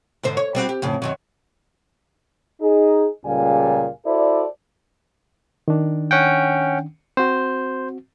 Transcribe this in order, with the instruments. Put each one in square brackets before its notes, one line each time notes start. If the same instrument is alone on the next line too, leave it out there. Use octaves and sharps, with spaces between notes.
[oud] G#2 D3 C5
C#5
G3 C4 F#4
G4
F2 A2 C#3
F#2 D#3 F#3
[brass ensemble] D#4 G#4
C#2 A#2 C#3 G3 F5 G#5
E4 F#4 A4 C5 D5
[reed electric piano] D#3 D4
[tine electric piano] C#4 F#5 G5
[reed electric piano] C4 F#4 [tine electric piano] C5